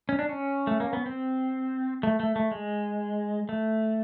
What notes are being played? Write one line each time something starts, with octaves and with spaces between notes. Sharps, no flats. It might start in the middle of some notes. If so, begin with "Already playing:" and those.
C#4
D4
C#4
A3
A#3
B3
C4
A3
A3
A3
G#3
A3